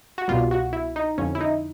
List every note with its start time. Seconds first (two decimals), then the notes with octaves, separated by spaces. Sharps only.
0.18 F#4
0.28 C2 B2 G3 F4
0.51 F#4
0.73 E4
0.96 D#4
1.18 F2 D3 F3 C#4
1.35 E4
1.41 D#4